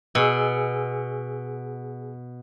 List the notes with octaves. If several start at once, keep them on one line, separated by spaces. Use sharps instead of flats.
B2 G#4 G#5 E6